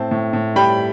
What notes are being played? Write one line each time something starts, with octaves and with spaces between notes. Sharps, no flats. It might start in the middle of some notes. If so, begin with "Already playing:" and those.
Already playing: A2 C4 A5
A2
A2
G3 G5 B5